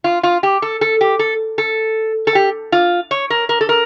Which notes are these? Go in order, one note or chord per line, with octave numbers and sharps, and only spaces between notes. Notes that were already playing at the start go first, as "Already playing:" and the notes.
F4
F4
G4
A4
A4
G4
A4
A4
A4
G4
F4
C#5
A#4
A#4
A4
A#4